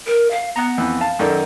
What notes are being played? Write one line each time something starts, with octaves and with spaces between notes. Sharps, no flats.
A#4
F5
B3 F#5 A#5
F2 E3
F5 A5
F#2 D#3 A4 D5